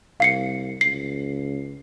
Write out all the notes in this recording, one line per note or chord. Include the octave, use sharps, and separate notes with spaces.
C2 F5 C7 C#7
C#2 C7